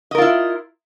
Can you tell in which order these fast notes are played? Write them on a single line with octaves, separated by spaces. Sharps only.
D#5 A#4 F4 E4